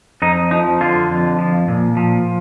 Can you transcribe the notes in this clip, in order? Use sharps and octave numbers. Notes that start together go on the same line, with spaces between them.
F2 D#4
F3 D#4
D3 F4
F2
F3
A#2
F3